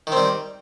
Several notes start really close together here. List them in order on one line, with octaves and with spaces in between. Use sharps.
D#3 C4 G3